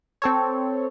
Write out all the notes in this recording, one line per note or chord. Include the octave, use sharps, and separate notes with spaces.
C4 A4 C#5